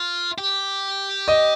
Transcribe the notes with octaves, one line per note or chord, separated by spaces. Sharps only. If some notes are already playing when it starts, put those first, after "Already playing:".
Already playing: F4
G4
D#5